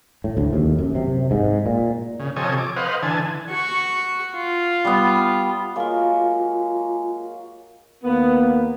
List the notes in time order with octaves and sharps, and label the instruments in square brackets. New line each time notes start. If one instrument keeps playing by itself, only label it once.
[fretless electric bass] A2
D2
D#2
F#2
C3
G#2
A#2
[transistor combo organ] C#3
C3 F3 A4 C#5 D#5 G#5
D6
B4 C5 D#5 F5 F#5
D3 E3 G#5 A5
[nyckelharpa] F#4 C#6
F4
[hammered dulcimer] G3 B3
[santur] F#3 G#3 A#3 [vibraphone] F4 G#5
[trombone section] D#2 A#3 [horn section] B3